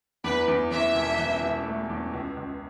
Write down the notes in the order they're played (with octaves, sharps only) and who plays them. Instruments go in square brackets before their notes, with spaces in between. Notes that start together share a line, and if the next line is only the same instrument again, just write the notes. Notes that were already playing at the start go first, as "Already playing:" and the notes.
[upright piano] E2 [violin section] B4
[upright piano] E2
[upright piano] E3 [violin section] E5
[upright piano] E1
E3
E1
A3
E2
C#2
C#2